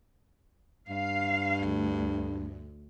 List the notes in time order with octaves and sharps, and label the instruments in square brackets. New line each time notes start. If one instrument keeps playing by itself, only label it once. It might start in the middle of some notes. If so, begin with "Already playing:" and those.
[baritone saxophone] G2 [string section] F5
[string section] D2